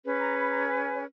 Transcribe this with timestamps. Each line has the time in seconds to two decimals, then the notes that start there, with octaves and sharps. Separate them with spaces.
0.04 C#4 G#4 B4
0.20 A#5
0.36 B5
0.51 A#5
0.67 G#5
0.95 C#5